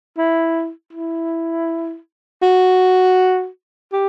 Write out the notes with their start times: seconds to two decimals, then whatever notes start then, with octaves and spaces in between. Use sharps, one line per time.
0.18 E4
0.93 E4
2.42 F#4
3.92 G4